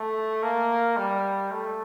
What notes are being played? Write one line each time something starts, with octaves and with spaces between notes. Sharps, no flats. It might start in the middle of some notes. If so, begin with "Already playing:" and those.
Already playing: A3
A#3
G3
A3